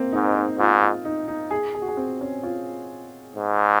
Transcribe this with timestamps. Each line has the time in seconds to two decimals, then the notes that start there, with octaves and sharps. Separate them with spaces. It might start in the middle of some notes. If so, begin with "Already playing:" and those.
Already playing: A#3 C4
0.12 G#2 D#4
0.35 D#4
0.59 G#2 F4
0.83 F4
1.05 D#4
1.28 D#4
1.51 G#4
1.75 G#4
1.82 F#4
1.88 G#4
1.97 C4
2.21 C#4
2.43 F4
3.36 G#2